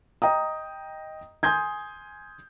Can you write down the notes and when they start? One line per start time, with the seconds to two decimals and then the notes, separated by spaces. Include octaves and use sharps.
0.22 D#5 G5 A#5 D#6
1.43 G#5 C6 D#6 G6 G#6